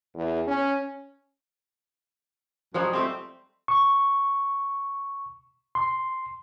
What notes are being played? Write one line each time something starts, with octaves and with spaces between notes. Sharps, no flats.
E2
C#4
F#2 F3 G3 G#3
A3 C4 G4
C#6
C6